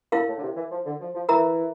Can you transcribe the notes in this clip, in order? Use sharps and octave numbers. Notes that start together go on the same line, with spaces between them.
A2 E4 A#4 F5
A2
D3
C3
E3
F3
D3
F3
F3
E3 E4 A#4 E5 A#5